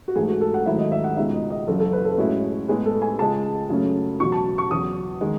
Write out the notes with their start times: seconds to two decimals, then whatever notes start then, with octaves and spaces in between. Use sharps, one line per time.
0.08 F#4
0.16 G#2 E3 A3 G#4
0.29 F#4
0.41 A4
0.54 F#5
0.66 G#2 D#3 F#3 A3 E4 E5
0.79 D#5
0.92 E5
1.04 F#5
1.16 C#2 B2 G#3 D#4 E5
1.34 D#5
1.50 D#5
1.67 F#1 F#2 E3 A4
1.80 A4
1.93 B4
2.05 A4
2.18 A2 G#3 C#4 E4 F#4
2.68 A2 G#3 B3 G#4
2.86 A4
3.02 G#5
3.19 C#2 C#3 G#3 A5
3.70 F#2 C#3 F#3 A3 C#4
4.20 E2 B2 F#3 C#6
4.32 A5
4.58 C#6
4.70 E2 C#3 F#3 D#6
5.21 D#3 G#3